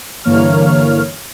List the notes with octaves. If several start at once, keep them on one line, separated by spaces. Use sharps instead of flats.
G2 D3 E3 A#3 C#5 F6